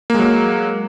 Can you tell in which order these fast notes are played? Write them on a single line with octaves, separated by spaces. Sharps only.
A#3 G#3 F#3